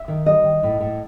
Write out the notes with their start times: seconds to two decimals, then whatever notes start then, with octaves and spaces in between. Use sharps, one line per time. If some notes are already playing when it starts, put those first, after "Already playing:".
Already playing: E5
0.08 D#3
0.26 G3 D#5
0.44 D#3
0.63 A2
0.81 A2